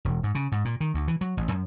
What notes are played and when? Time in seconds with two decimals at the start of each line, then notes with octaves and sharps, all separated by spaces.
0.05 E1
0.23 G#2
0.35 C#3
0.52 G#2
0.65 A#2
0.80 D#3
0.94 D2
1.08 E3
1.21 F#3
1.37 A1
1.51 F#2